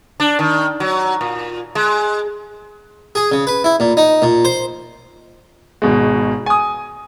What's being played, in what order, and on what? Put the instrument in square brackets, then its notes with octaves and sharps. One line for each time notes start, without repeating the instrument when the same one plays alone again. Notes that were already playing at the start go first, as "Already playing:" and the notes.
[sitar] D4
D#3
F#3
A#2
G#3
[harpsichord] G#4
C#3
B4
E4
A#2
D#4
A#2
C5
[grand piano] G#1 B2 G#3
G#5 D#6